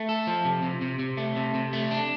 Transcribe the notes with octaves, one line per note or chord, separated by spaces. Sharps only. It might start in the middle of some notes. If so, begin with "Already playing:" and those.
Already playing: A3
A4
F3
C3
C3
C3
C3
A3
C3
C3
A3
D4